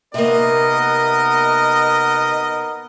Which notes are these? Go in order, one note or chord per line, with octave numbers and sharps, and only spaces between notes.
C3 A#3 B3 D#4 A#4 D#5